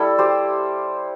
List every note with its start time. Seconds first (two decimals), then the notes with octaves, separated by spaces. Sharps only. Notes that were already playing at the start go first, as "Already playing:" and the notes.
Already playing: G3 E4 A4 D5
0.18 G4 C5